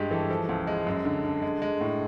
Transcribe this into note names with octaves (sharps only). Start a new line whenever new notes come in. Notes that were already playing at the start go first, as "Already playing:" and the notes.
Already playing: G2 G#3 G4
E3 A4
F3 A4
C#2
G#3
F#2
D3
D3
G#3
G#3
A2